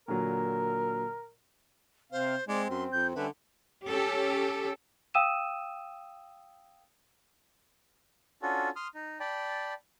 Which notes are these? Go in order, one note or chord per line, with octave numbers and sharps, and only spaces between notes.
A#2 D3 F#3 A#4
C3 C4 C5 F5
G#3 C4 D5
F#2 C6
F2 G6
D3 G3 C#4 B4 E5
C#4 G4 A4
F5 G5 D#6 E6 D#7 E7
C#4 D4 F4 F#4 A4
C6 D#6 F6
D#4
D5 G5 A5 B5